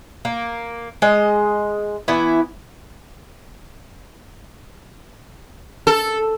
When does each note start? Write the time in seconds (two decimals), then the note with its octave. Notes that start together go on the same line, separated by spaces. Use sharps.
0.25 A#3
1.02 G#3 D#5
2.08 E3 B3 E4
5.87 A4